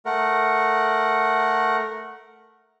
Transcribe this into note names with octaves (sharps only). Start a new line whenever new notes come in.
A3 A#4 F#5